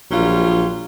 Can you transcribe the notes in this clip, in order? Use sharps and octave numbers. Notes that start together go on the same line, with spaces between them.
A#1 F#3 G3 F4